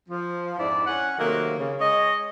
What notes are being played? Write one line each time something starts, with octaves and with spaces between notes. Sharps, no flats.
F3
F2 G#2 D4 E4 D5
C#4 F#5
C3 D#3 F#3 A3 A#3
C#3
G#3 C#5 D#5